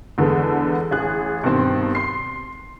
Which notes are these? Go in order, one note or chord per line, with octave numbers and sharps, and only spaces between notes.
E2 D3 G#3 A4 B4
A1 G#4 F#6
G2 B2 D#3 C4
C6 C7